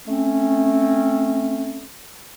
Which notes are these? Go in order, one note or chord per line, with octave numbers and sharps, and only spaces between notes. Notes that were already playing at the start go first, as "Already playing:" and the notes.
A3 C4 C#4